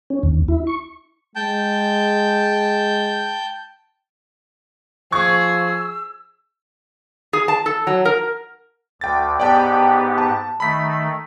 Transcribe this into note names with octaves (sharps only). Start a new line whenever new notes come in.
C#4
D#2
E4
C#6
G#3 G5 A5 G6
F3 G#4 C#6 E6 G#6
G#4
A5
A4
F#3
A#4
D2 G5 A6
G#2 B3 G4 D5 G5 A5
A5
D#3 A3 B5 B6